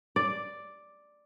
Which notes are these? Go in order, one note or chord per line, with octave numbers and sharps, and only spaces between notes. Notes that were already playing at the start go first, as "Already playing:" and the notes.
D5